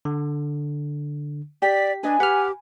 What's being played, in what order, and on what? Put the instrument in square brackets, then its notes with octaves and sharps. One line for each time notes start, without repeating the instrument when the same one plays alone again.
[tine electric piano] D3
[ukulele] G4 [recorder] D5 [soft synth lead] B6
[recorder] D4 [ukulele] B4 D#5 [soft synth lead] G#5
[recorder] G4 [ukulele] B4 [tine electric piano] F#5 F6